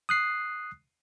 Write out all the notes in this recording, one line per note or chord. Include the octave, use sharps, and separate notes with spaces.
D#6 F#6 C7